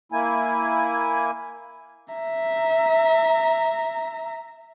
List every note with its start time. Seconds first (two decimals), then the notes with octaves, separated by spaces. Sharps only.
0.12 A#3 E4 G#5
2.14 E5 A#5